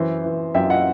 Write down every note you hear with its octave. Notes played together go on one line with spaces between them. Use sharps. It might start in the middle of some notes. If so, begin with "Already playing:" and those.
Already playing: F#2 E3 C5
E3
F#2 E5 G5
D#5 F#5